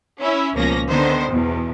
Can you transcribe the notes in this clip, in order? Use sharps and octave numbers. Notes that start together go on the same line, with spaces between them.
C#4 E4
C#2 B2 F3 A#3 C#4 A#6
D3 D#3 B3 C5
E2 B2